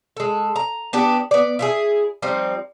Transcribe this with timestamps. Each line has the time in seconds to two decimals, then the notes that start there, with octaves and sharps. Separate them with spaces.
0.17 G#3 A4
0.56 A#5
0.93 B3 D4 G4
1.31 B3 D5
1.59 E4 F4 G#4
2.22 F3 G3 C4 D#4